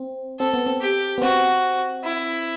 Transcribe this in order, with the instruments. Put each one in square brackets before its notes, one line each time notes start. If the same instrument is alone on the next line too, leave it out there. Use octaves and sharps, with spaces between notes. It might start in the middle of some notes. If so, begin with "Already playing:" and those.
Already playing: [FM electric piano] C4
[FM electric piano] C4 [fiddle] A4
[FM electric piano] B3
C4
[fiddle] G4
[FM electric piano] B3
[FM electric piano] C4 [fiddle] F#4
[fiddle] E4